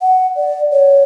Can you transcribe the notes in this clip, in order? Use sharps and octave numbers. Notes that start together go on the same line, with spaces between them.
F#5
D5
C#5